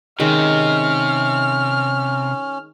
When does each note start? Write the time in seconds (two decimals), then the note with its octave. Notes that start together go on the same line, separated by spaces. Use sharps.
0.20 C3 D#3 G#3 C#4 F6